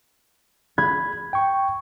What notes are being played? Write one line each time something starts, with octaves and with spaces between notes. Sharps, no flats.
B5 G#6
G5 C#6